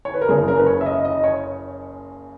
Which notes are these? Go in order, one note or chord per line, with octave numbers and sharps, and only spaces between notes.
C#5
B4
A#4
F#1 F#2 C#3 G#4
A#4
B4
C#5
E5
D#5
D#5
C#5